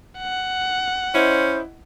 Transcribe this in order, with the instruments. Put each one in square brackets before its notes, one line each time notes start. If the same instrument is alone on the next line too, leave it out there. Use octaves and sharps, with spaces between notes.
[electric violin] F#5
[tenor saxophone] C#4 [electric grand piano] E4 D#5 [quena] C5